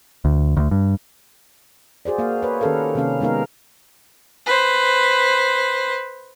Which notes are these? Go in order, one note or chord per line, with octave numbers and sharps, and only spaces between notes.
D2
D2
G2
F#4 G#4 C5 D5
A#3 F#4 F5
B4 C#5
D#3 C#4 G4 A4 A#4 F5
C3 D#3 A#3 C#4 F5
G#3 B3 D#4 A#4 F5
B4 C5